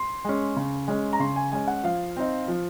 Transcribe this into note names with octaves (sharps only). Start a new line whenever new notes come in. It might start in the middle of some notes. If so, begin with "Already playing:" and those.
Already playing: C6
G#3 C#4
C#3
G#3 C#4
A#5
C#3 C6
G#5
G#3 C#4 G#5
F#5
F3 F5
C4 D#4
F3